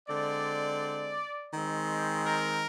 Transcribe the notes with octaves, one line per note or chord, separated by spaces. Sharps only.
D3 G#3 C4 D5
D#3 G#3 C4
A#4